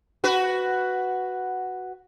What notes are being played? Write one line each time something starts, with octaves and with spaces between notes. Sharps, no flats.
F#4 B4